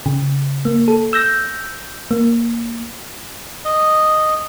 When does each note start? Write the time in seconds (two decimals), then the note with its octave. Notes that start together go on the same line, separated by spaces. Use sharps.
0.06 C#3
0.65 A#3
0.88 A4
1.13 E6 G6 A#6
2.11 A#3
3.65 D#5